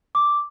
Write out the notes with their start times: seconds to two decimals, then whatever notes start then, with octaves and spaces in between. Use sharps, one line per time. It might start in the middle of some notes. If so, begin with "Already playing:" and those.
0.15 D6